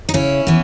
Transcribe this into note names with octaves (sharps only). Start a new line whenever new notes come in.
D#4
C#3 C#4 E4
E3 B3